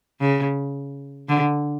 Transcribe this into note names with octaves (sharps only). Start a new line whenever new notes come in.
C#3
D3